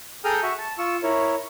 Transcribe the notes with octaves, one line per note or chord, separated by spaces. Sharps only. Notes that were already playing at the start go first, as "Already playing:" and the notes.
G#4 A4 G5 A#5 D#6 F6
F#4 E5 C#6
A5
F4 C#6 E6
E4 A#4 C#5